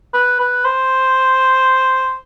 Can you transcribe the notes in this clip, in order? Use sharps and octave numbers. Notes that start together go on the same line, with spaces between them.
B4
B4
C5